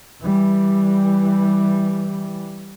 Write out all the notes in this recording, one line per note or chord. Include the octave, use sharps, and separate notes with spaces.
E3 G3